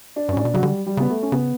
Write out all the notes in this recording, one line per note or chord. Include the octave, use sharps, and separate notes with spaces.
D4
G2
C#4
A2 D4
B2
C#3 F#3
D3 G3
G3
C#3 B3
A3
C#4
C#3 B3